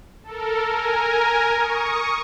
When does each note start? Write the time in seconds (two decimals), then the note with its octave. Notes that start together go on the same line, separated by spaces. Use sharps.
0.23 A4 A#4
0.67 A#4 G#5
1.54 C#6 D#6